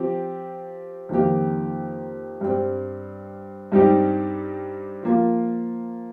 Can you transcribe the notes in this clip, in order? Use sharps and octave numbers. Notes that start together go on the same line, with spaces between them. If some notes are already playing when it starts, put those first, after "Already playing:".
Already playing: F3 C4 G4
F2 D#3 A#3 D#4 G4
G2 G3 C4
G2 G3 C4 D#4 G4
F3 A#3 F4